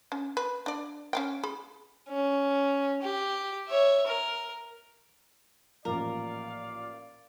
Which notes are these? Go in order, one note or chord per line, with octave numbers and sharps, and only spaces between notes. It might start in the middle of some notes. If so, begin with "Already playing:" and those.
C#4
B4
D4 D5
C#4 F5 G5
G#4 B5
C#4
G4
C#5 E5
A#4
A1 A#2 F3 A#4 D5 F5